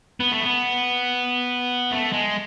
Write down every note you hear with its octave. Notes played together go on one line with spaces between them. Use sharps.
B3
A3
B3
A3
G#3